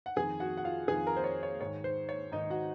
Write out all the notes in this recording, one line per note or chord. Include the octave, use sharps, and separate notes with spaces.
F#5
F2 D#3 G#4 G#5
F#4 F#5
F#5
F4 F5
F2 D#3 G#4 G#5
A#4 A#5
C5
C#5
C#5
G#2 D#3 C#5
C5
C#5
G#2 D#3 D#4 D#5
F#4 F#5